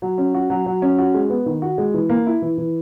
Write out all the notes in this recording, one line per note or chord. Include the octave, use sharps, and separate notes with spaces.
F#3
C#4
F#4
F#3
F#3
C#4
F#4
G#3
B3
D#3
F#4
G#3
E3
A#3
E4
E3
E3